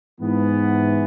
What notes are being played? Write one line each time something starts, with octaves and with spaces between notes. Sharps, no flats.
G#2 E3 B3